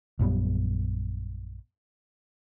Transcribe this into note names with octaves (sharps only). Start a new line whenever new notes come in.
A#1 F#2 G3 B3